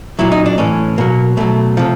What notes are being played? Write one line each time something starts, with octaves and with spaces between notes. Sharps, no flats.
A#2 F#3 E4
D#4
D4
A2 E3 C#4
B2 F#3 A#3
B2 F#3 A3
C3 F3